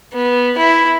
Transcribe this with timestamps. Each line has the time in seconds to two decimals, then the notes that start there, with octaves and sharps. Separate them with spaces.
0.14 B3
0.58 E4